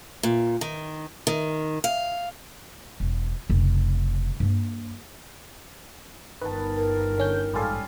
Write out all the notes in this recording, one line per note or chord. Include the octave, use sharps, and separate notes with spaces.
A#2
D#3
D#3
F5
E1
F1 C#3
G2 A#3
G1 D#3 B4 A5
A#4
D3 C#4 G6
A1 G#2 G3 C#4 F4 A4